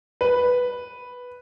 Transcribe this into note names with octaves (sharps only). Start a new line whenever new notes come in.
B4